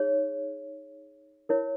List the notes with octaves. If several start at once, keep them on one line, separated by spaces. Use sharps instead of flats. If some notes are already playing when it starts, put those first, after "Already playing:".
Already playing: D#4 G#4 C#5
E4 A#4 C#5